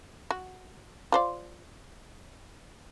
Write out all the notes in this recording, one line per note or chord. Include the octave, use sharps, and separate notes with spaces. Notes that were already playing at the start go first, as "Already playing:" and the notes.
F#4
F4 C5 D5